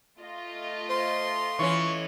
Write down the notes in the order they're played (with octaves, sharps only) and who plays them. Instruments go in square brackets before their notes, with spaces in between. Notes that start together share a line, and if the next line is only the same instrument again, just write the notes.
[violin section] A3 F4 D#5
[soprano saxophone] C5 [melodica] C6
[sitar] E3 C#4 [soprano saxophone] C#6